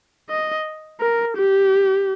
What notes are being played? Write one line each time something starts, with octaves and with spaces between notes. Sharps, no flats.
D#5
A#4
G4